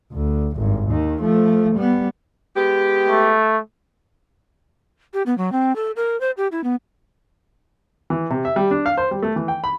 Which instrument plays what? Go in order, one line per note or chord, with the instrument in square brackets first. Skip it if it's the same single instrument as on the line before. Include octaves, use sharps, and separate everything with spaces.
[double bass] D2
G#1 G2
D#2 D#3
F3 A3
G3 B3
[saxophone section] G#3 B3 G4
[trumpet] A3
[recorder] G4
B3
F#3
C4
A4
A#4
C5
G4
E4
B3
[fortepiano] E3
C3
E5
G3
D4
F5
C5
G3
A3
E3
G5
B5